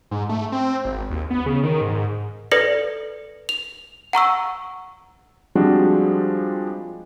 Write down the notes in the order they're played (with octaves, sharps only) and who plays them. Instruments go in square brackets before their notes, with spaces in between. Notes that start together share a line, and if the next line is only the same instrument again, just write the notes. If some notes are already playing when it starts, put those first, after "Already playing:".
[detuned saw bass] G#2
A3
C4
G#1
D#2
B3
C#3
D#3
G#2
[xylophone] A4 B4 D5 A#6 C#7 F#7
F7
F#5 A#5 C#6 E6
[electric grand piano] F3 G3 G#3 C4 D4 F#4